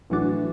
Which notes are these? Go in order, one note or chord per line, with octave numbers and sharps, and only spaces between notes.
A1 A2 E3 F#3 D4 F#4